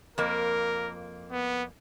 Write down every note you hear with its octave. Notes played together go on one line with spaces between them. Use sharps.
F2 A#3 A#4
B3